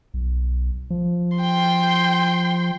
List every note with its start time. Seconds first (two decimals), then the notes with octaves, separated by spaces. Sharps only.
0.14 B1
0.90 F3
1.38 G5 C6